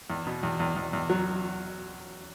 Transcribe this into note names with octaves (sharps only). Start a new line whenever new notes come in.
E2
B2
E2
E2
E2
E2
F#3